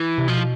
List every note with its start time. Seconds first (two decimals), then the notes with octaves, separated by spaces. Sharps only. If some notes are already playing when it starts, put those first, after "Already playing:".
Already playing: E3
0.18 C3
0.28 B2 F3